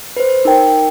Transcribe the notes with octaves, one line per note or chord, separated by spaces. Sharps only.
B4 C5
D#4 A#4 G5